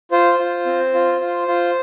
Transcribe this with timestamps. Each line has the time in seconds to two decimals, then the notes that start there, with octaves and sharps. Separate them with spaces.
0.11 F4 C5
0.39 F4
0.66 C4
0.94 F4
1.21 F4
1.48 F4